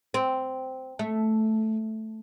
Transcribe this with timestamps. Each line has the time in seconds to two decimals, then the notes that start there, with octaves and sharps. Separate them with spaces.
0.14 C4
0.99 A3